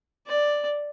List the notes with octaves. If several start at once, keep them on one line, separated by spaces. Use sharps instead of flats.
D5